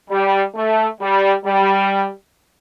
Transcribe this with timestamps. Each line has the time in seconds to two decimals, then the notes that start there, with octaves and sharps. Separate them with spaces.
0.10 G3
0.55 A3
1.01 G3
1.45 G3